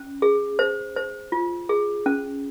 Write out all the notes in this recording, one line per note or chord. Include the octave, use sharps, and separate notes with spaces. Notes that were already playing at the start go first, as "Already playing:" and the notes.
Already playing: C#4
G#4
C5
C5
F4
G#4
C#4